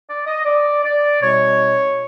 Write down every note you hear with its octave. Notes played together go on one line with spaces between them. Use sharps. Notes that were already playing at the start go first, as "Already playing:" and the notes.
D5
D#5
D5
D5
B2 G3 C4 D#4 C#5